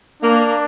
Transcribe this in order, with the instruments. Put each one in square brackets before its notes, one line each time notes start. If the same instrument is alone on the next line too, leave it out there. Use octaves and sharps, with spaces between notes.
[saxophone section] A#3 [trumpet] D4